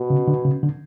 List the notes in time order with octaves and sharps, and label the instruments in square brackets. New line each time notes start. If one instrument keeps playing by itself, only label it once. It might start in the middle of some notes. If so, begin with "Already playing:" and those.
Already playing: [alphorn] B2
[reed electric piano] C#3
D3
C#3
D3